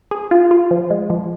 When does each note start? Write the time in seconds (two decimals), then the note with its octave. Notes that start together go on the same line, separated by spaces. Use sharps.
0.11 G#4
0.31 F4
0.51 F4
0.71 F3
0.90 G#3
1.10 F3